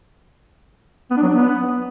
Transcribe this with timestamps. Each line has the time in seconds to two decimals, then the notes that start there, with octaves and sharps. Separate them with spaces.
1.11 B3
1.17 D4
1.23 F#3
1.29 D4
1.35 B3